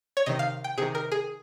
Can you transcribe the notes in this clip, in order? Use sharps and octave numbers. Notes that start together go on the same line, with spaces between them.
C#5
C3 D#3 D#5
F5
G5
C3 D#3 G#4
A#4
G#4